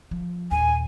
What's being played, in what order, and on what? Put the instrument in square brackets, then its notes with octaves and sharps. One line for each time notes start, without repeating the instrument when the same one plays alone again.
[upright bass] F3
[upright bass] D#2 A#2 [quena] G#5